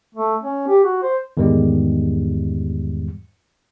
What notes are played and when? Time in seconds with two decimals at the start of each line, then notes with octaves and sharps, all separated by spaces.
0.15 A3
0.43 C#4
0.67 G4
0.84 F#4
1.03 C5
1.37 E2 G#2 D#3 G3 G#3